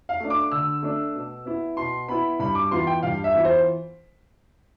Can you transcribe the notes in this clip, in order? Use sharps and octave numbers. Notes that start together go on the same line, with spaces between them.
F5
A3 D4
D6
D3 E6
A3 D4
B2
B3 E4
B2 C6
B3 E4 B5
G2 B5
D6
E3 B3 F4 C6
G5
G2 F5
E5
E3 B3 F4
C5